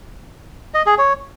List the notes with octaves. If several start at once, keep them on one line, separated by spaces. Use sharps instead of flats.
D#5
G#4
C#5